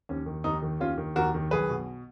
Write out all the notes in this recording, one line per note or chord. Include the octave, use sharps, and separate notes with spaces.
D#2 C#4
D#3
D#2 D#4
D#3
D#2 C#4 F4
D#3
D#2 F#4 A#4
D#3
B1 G#4 B4
B2